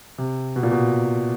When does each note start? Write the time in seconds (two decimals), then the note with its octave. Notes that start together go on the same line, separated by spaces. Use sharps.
0.18 C3
0.56 B2
0.63 A#2
0.72 B2